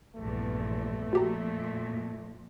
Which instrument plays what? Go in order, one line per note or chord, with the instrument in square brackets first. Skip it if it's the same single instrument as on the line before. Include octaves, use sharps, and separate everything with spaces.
[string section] A#1 E2 G2 [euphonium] A3
[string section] F2 A#2 [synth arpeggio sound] F#4 G4 A#5